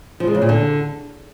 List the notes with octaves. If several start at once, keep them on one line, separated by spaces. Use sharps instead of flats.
F3
G#3
C#3
A#2
D3